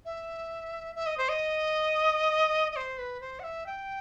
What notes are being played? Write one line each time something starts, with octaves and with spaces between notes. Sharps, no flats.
E5
E5
D#5
C5
D#5
D#5
C5
B4
C5
F#5
E5
G5